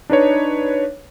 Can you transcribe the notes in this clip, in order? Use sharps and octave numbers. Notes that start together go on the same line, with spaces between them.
D4 D#4 B4 C#5